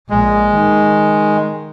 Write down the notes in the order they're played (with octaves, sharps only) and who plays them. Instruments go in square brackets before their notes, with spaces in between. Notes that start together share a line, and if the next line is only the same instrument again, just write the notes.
[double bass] A#1 [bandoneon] G#3
[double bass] D#3